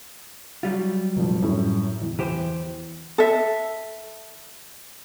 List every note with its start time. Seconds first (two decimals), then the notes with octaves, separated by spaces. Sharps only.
0.63 F#3 G3 F4
1.16 F1 A#2 F3
1.42 F#2 A2
2.02 E2
2.19 E3 G4 C5
3.18 A4 E5